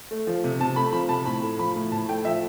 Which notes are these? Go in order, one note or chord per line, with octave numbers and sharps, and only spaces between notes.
A3
F3
C3
C3 A5
A3 B5
F3 B5
C3 A5
A2 B5
A3
F3 B5
A2
A2 A5
A3 G5
F3 E5